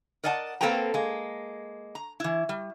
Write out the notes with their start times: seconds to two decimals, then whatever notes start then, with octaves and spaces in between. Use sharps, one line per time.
0.24 A#4 D5 D#5 F#5 G#5 A5
0.61 A#3 C4 A4 B4 G5 A#5
0.94 G#3 A#3
1.95 A#5
2.20 E3 E4
2.49 G3